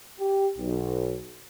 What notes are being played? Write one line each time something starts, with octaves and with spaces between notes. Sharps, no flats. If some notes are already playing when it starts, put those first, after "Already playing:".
G4
B1